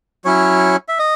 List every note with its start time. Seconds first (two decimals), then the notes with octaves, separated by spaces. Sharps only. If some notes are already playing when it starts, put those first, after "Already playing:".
0.25 F#3 C#4 E4 C#5
0.88 E5
0.99 D#5